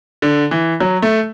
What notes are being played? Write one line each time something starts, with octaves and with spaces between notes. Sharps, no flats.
D3
E3
F#3
A3